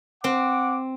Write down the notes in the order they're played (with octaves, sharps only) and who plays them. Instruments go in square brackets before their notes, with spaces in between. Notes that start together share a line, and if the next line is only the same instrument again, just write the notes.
[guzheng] C4 [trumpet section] F#5 D6